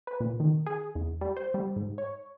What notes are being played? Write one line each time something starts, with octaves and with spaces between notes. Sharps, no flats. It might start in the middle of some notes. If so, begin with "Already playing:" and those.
B4
A#2
D#3
G#4
E2
G3
C5
G3
G#2
C#5